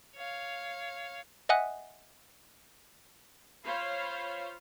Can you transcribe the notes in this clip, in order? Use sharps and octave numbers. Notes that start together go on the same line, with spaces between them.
C#5 F5
D#5 E5 F#5 G#5 D#6 F#6
F4 C5 C#5 F5 B5